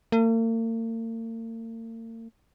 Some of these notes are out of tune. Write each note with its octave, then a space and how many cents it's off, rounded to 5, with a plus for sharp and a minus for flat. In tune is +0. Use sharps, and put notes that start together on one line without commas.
A#3 -45